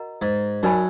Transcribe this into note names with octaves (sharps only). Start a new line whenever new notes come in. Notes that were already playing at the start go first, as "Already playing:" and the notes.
Already playing: F#4 A#4 D#5 F#5 A#5
G#2
F#2 D#4 A#4 D5 G#5 B5